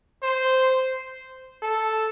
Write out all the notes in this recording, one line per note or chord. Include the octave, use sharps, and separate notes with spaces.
C5
A4